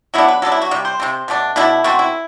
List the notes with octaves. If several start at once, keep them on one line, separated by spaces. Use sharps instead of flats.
F#3 B3 D4 E4
B4
F#3 B3 D4 A4
E4
F#4
C3 G3
C5
C3 G3 C4
B2 A3 D4
B2 A3 D4 E4
B2 A3 C4 F#4
E4